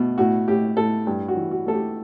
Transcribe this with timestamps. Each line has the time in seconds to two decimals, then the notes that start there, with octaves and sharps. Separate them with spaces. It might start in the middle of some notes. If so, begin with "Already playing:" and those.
Already playing: B2 A3
0.18 A2 F#4
0.48 A2 G4
0.77 A2 A4
1.07 G2
1.28 F#4
1.37 E3
1.51 F#4
1.66 A3 A4
1.74 G4